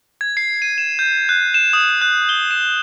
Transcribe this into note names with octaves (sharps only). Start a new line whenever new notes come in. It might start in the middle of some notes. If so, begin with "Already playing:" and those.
G#6
C7
D#7
E7
G6
F#6
E7
D#6
F#6
G7
E7